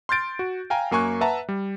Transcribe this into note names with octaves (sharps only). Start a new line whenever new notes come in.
C6 F6 G6 A6 D7
F#4
F5 G5 G#5 A#5
F#2 A#3 G#5 C#6 F#6
B4 E5 F#5 A5 A#5
G3